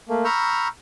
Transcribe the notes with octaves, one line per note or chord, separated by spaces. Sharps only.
A3 A#3
A#5 B5 C#6 E6 F6 G6